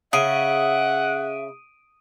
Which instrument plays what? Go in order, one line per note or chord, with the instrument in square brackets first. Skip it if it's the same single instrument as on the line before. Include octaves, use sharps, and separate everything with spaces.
[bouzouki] C#3 [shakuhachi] E5 [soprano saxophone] F#5 [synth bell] D#6 D7 D#7